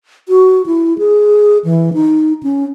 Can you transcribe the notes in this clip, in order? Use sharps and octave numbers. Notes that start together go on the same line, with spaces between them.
F#4
E4
G#4
E3
D#4
C#4